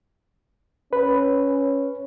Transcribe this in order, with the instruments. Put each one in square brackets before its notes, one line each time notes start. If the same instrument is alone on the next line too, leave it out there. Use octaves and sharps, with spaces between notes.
[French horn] C#4 [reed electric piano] B4